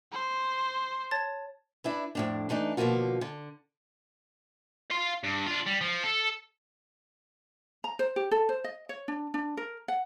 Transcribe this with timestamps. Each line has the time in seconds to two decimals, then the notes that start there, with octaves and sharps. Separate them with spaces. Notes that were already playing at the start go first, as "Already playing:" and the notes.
0.12 C5
1.11 C#5 A5 A6
1.84 D4 E4 B4
2.15 F2 A2 D4
2.49 E3 A3 D4 D#4
2.77 B2 D3 F3 A#3 F4 F#4
3.21 D3
4.91 F5 C6
5.23 G2
5.46 D4 F4
5.67 G3
5.81 F3
6.03 A4
7.84 A#5
7.99 C5
8.16 G4
8.31 A4
8.49 C5
8.64 D#5
8.89 C#5
9.08 D4
9.34 D4
9.57 A#4
9.88 F#5